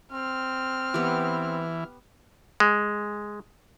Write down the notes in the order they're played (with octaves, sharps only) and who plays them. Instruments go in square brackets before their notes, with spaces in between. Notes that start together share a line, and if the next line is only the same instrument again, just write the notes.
[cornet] C4 [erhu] F6
[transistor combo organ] E3 [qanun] B3 G4
[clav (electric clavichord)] G#3